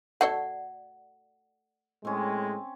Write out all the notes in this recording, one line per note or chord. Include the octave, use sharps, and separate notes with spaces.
A3 F#4 A4 D5 F#5
A2 G#3 C4 C#4